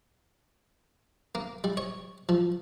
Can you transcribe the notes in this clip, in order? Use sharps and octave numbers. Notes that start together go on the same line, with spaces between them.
A#3
G3
C#5
F3